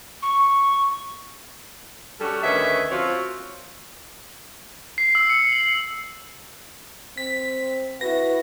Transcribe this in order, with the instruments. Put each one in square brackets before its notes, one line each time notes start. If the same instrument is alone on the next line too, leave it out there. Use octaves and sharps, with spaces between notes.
[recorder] C#6
[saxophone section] G3 C#4 F#4 A4
D2 D#3 C#4 B4 E5
F3 C4 F4 F#4 C#5
[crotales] C7
E6
C#7
F#7
[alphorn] C4 [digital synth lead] B6
[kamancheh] E4 F#4 [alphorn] B4 [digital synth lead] A#6